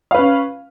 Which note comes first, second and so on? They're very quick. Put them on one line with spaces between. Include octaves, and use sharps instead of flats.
F5 B4 C#4